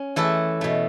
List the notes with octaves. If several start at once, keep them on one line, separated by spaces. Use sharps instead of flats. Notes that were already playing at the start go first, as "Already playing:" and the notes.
Already playing: C#4
E3 A3 E4 A4
B2 A3